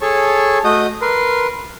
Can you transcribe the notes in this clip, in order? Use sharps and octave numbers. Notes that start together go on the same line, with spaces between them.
G#4 A4 C#5 A5 C#6
A3 F#4 D#5 D#6 G6
A#4 B4 C6